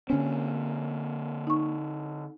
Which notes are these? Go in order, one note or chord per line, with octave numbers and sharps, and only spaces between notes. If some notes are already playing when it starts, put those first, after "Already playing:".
D3 A#3 C4 C#4
D#4 C#6